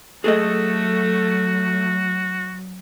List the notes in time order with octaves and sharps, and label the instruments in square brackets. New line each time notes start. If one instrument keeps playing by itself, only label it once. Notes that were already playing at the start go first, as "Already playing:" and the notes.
[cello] F#3 [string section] A3 [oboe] F#4 [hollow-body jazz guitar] G#4 A4 D#5